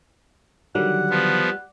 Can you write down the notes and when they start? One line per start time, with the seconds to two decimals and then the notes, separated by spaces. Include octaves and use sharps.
0.75 D3 D#3 F#3 G3 F#5
1.10 F3 B3